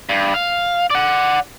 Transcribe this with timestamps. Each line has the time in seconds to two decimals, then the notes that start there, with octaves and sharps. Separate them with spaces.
0.09 G2
0.34 F5
0.90 D5 F#5